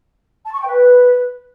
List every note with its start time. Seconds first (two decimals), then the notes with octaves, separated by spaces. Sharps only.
0.45 A5
0.52 C#6
0.59 G5
0.66 B4